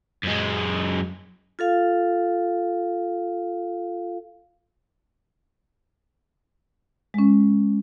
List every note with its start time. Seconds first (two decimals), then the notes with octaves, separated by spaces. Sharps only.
0.23 F#2 G#3
1.59 F4 A4 F5
7.14 G#3 C#4